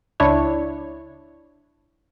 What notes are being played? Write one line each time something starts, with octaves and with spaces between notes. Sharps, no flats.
C#2 D4 E4 C#5